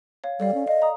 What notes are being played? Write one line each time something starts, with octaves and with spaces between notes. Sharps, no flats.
C#5 F5
G3 A4 D5 F5
C#4
D#5 F5
A#5 D#6